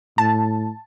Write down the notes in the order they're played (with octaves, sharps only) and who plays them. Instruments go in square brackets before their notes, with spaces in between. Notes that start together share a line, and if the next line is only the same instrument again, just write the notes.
[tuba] A2 [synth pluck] A5